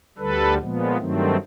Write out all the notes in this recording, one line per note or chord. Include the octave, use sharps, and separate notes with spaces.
D2 D3 G3 A4 B4
A#2 F3 G#3 B3
G2 D#3 F#3 A3 C4